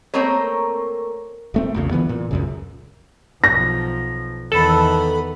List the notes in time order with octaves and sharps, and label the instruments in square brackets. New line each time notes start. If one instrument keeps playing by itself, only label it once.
[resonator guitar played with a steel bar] A3 A#3 C4 A#4 C#5
[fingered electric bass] D#1 A3 C4
A#1 E2 C#3
D3 E3 G3 B3
A#2
C#2 F#2 C#3
[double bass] B1 F3 [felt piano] A#6
[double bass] E2 D#3 [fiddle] B3 B5 [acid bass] A4